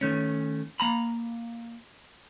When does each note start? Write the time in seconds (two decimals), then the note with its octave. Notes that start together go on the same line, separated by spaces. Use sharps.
0.01 D#3 A3 C#4
0.80 A#3 A#5 B5